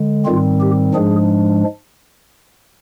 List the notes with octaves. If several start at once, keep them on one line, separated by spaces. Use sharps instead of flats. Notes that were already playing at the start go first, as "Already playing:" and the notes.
Already playing: D3 G#3
G#2 D#3 G3 C4 F4
G4
G#2 F3 G#3 D4 G#4